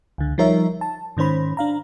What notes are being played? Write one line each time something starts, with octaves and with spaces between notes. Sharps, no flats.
C#2 D3
F3 G3 D#4 A#4 C#5 E5
A5
G#2 D#3 C#4 C5 B5
D4 F5 A#5